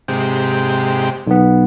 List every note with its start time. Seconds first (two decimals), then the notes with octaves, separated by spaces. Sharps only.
0.08 G#2 C3 G4
1.27 B1 B3